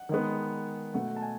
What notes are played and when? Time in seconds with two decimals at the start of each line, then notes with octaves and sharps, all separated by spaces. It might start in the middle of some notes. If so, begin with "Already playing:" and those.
Already playing: F#5
0.09 D#3 G#3 B3
0.94 B2 A3 F#5
1.16 A5
1.22 G#5